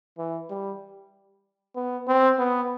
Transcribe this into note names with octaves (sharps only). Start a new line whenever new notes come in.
E3
G3
B3
C4
B3